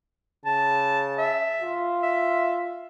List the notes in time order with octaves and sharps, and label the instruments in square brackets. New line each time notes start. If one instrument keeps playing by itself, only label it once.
[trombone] C#3 [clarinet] A5
[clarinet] E5
[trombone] F4
[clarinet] E5